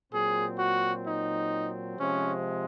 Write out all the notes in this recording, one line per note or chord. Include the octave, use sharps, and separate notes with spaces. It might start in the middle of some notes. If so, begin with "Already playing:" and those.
A#2 F#3 C4 G#4
F#4
D#4
C3 F3 G#3 C#4